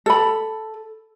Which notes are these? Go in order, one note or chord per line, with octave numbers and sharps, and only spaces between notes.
A4 B5